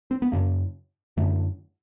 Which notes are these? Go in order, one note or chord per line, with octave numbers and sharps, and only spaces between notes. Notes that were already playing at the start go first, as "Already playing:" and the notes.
C4
B3
F#2 C#3 A#3
F#2 D3 A3